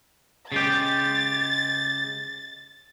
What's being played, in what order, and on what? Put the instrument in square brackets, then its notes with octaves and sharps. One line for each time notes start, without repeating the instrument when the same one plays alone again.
[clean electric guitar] C#3 G#3 G4 [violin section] A6